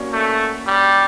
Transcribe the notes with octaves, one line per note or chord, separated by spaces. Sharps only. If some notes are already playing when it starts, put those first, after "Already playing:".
Already playing: A#3 C#4 F#4 D5
A3
G3